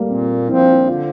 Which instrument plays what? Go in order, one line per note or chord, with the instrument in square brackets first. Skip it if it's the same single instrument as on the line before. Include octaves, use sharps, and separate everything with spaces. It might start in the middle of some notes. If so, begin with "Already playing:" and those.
Already playing: [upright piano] G3 A3 A#3
[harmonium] A#2 [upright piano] C4
[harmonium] F3 C4 [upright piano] E4
[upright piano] D4
E4
[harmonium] D3 [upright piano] F4